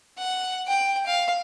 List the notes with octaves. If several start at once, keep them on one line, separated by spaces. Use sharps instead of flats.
F#5
G5
F5